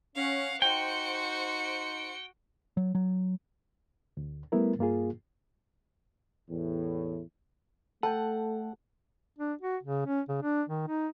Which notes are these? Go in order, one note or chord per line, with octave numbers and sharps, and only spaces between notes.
C#4 F5 F#5
D#4 F#4 C5 G5 C#7
F#3
F#3
D2
G3 A3 B3 E4 A#4
G2 A#3 F4 G#4
E2 A2
A3 A4 F#5 G5 A5
D4
F#4
C#3
C#4
C#3
D4
D#3
D#4